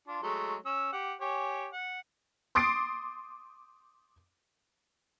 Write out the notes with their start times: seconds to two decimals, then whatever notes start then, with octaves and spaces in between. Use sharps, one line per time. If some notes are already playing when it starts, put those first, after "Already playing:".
0.07 D4 F4
0.23 F#3 G#3 A3
0.66 C#4 E6
0.93 G4 F#5
1.21 G4 C#5 G#5
1.73 F#5
2.55 C6 D6 D#6 A6 C7 D7